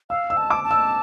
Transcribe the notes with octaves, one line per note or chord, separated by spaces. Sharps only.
F5 E6
E6
A5
D6
A5
E6